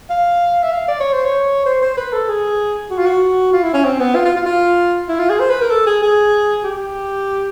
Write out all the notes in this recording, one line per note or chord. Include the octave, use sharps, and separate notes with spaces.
F5
E5
F5
D5
C#5
C5
C#5
C5
C5
B4
A4
G#4
F#4
F4
F#4
F4
E4
C#4
C4
B3
F4
F4
F4
F4
E4
F4
G#4
C5
B4
A#4
A4
G#4
G#4
G4